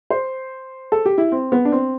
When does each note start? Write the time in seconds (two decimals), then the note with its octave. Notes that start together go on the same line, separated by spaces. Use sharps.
0.10 C5
0.92 A4
1.06 G4
1.18 E4
1.32 C4
1.52 B3
1.65 D4
1.72 C4